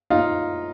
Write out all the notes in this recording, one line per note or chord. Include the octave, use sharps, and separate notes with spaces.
D#4 F4